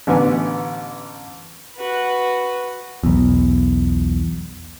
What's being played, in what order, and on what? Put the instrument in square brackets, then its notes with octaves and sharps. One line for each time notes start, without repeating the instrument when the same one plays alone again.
[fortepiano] A1 D3 B3 G#5
[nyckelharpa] F#4 B4
[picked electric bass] B1 E2